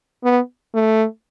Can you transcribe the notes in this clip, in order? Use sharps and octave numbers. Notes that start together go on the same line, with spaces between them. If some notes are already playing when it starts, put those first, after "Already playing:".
B3
A3